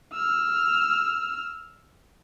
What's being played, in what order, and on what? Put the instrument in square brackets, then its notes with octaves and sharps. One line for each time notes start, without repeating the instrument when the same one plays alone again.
[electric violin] E6 F6